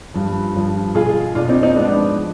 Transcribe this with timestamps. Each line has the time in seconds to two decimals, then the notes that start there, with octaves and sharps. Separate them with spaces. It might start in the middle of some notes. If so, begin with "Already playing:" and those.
0.14 G2 F3
0.55 G2 F3
0.95 B2 F4 G#4
1.35 B2 D4 F4
1.49 C4 D#4
1.63 C4 D#4
1.76 G#2 F3 B3 D4
2.16 F3